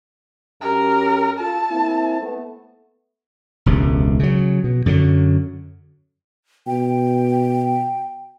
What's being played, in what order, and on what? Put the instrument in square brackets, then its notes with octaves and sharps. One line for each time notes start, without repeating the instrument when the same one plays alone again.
[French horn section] F#2 C#4 G4 [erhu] A#4
[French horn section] F4 A4 [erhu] A5
[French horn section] A#3 C4 E4
A3 B3
[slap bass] E1 C#2 C3
C#3 F#3
B2
F#2 D3 E3 F#3
[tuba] B2 [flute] G5